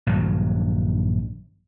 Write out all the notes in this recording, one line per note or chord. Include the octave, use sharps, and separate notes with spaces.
A#1 G2 D#3 F#3